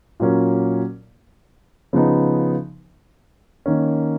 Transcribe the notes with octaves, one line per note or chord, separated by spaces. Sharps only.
A#2 F#3 A#3 C#4
C#3 F3 B3 D#4
D#3 A#3 C#4